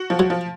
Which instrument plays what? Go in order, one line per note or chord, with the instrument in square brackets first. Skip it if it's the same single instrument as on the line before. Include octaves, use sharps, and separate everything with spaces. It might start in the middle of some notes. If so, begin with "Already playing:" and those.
Already playing: [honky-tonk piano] F#4
F3
[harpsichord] F#3
[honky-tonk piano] F3